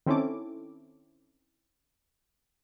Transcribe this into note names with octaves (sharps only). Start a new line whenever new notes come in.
D#3 C4 C#4 E4 A4 D6